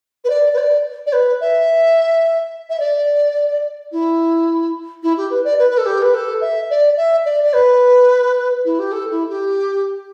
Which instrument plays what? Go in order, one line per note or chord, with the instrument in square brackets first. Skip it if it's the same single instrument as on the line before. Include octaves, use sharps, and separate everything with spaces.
[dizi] B4
D5
B4
D5
D5
B4
E5
E5
D5
E4
E4
G4
B4
D5
B4
B4
A4
G4
B4
A4
E5
D5
E5
D5
D5
B4
E4
G4
A4
E4
G4